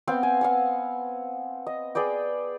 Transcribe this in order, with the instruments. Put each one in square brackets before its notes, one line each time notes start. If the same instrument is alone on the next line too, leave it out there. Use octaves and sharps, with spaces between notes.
[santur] B3 C4 F5 G5
G#5
F5 F#5 G#5
D#5
G#4 B4 D5 G5